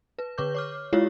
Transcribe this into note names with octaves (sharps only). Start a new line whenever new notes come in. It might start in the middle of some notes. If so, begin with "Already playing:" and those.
B4
D3 B4 C#6 D6 G6
C#5 D6 F6
G#3 E4 F4 G4 C#5 F5